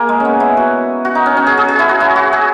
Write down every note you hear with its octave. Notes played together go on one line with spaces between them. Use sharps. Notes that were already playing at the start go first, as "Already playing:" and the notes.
Already playing: A#3 G#4
G#3
B3 C#4
E4
F#4
F#4
D#4
C#4
C#4
G#4
G#4
G#4
E4
F#4
E4
F#4
G#4